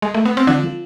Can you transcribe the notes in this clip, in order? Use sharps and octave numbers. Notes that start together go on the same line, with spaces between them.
G#3
A3
B3
C4
D3 F3 D4
F3